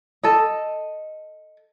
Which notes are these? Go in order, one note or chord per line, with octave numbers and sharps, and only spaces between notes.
A4 D#5